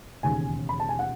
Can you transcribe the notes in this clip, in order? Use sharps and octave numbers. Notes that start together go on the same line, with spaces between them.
E1 D#2 C#3 G#5
B5
A5
G#5
F#5